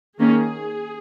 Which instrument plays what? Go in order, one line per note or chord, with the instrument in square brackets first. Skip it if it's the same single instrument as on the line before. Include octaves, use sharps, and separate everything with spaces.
[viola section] D#3 A#3 C#4 G#4